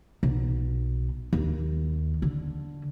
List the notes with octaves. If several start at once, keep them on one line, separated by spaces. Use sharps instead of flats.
B1
D#2
D3